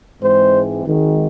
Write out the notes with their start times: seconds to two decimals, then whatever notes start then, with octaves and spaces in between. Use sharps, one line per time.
0.21 G#2 E3 G#3 C4 C5
0.84 G#1 G#2 D#3 G#3